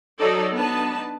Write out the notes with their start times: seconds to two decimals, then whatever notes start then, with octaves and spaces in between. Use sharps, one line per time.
0.19 F#3 D#4 A4 C#5 D5
0.54 B3 D4 D#4 B4 A5